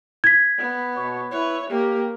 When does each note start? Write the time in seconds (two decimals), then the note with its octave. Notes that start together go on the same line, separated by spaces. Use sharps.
0.24 G#6 B6
0.58 B3
0.96 B2 C#5
1.31 E4 B4 C#5
1.70 A#3 G4